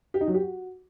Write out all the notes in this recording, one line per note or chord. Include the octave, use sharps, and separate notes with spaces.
G4
D#4
F#3
G4
F#4